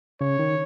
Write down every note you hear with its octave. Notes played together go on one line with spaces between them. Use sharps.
C#3 C#5
D#3